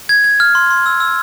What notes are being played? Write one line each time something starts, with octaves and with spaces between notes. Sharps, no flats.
G#6
G#6
F6
C6
C6
E6
E6